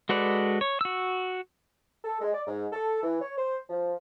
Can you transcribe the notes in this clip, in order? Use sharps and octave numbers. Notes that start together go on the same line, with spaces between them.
G#3 F#4 A4 B4 D5
C#5
F#4 E6
A4
G#3
D5
G#2
A4
E3
C#5
C5
F3